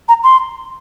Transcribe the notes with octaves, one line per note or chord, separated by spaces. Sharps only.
A#5
C6